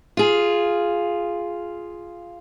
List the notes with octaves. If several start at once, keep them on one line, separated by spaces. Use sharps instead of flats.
F4 G#4